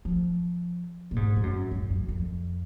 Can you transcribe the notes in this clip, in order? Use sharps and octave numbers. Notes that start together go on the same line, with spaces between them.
F3
A#2
G#2
G#2
F#2
G#2
F#2
F2